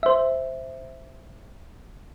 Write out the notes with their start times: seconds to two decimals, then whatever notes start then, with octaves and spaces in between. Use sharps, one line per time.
0.03 C5 E5